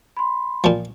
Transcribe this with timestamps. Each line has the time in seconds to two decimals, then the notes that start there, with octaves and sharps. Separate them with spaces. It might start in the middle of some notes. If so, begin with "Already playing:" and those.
0.17 B5 C6
0.64 A#2 F3